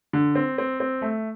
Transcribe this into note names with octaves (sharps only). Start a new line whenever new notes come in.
D3
C4
C4
C4
A3